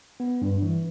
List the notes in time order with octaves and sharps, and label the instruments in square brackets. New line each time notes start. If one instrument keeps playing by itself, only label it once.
[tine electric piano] B3
G2
E3